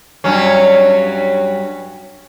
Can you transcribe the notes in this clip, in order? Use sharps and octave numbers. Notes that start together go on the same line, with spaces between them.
G2 F#3 C#4